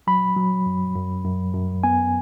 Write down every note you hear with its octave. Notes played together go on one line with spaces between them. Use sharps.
F#3 B5
F#3
F#2
F#2
F#2
F#2
B3 G#5